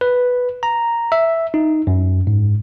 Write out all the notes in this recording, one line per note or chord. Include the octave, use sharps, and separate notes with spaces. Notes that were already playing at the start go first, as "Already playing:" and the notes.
B4
A#5
E5
D#4
F#2
G#2